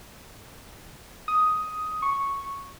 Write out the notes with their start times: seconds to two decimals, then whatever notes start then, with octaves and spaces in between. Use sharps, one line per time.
1.28 D#6
2.02 C#6